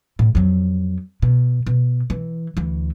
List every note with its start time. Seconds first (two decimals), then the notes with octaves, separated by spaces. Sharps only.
0.19 A2
0.35 F2 F#3
1.22 B2
1.67 B2
2.10 E3
2.57 D2 E3